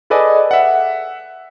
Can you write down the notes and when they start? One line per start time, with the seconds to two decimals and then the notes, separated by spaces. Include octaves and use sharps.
0.10 G#4 A4 B4 D5 D#5 G#5
0.51 E5 F#5